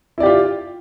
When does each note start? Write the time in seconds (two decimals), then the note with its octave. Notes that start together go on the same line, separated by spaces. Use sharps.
0.18 E4
0.20 D5
0.23 G4
0.26 F4